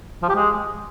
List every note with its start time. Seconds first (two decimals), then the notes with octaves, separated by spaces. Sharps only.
0.23 F3
0.29 G4
0.35 G#3